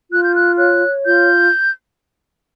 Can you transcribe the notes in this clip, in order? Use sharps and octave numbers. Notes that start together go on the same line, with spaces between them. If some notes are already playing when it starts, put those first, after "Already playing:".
F4 F#6
G6
F#6
C#5 F#6
F4 G6